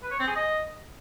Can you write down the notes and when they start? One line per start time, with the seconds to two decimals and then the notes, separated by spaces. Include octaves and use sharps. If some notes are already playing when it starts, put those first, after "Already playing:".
0.03 B4
0.11 C#5
0.19 C4
0.28 G#4
0.36 D#5